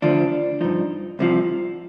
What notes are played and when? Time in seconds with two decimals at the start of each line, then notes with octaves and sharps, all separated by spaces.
0.02 D2 D3 F3 D4
0.61 G2 F3 D#4
1.19 C2 C3 F3